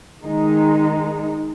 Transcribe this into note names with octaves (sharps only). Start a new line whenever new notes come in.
D#3 G#3 D#4